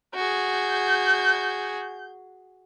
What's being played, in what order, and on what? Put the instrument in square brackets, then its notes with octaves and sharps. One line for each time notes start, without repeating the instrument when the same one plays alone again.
[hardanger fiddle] F#4 G#4 [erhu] G6